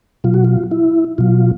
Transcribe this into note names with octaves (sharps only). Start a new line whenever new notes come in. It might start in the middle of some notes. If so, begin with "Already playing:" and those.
B2 F#3 F4
F#4
F4
E4
B2 F#3 F4